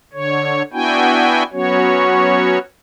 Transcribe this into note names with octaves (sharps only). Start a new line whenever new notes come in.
D3 C#5
B3 D4 E4 F#4 G5 G#5
F#3 B3 C#4 F#4 C#5